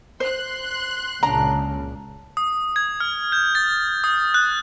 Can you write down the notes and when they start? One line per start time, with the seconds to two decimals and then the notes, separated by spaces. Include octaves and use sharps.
0.20 C5 C6 F#6
1.23 C#2 A#2 C#3 D4 A#5
2.37 D#6
2.76 G#6
3.00 F6
3.32 G6
3.55 A6
4.04 D#6
4.34 F#6